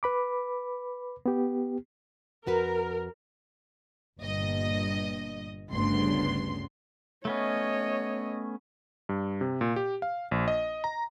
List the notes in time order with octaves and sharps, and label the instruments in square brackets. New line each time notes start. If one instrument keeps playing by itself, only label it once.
[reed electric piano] B4 B5 D6
B3 G4
[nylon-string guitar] F2 F#4 B4 [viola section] A#4
[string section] G1 G2 A#2 D#5
G1 D2 G2 C#3 B3 C6
[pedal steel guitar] A3 B3 C#4 [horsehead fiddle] C#5 D#5
[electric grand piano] G2
C3
A#2
G4
F5
A#1
D#5
A#5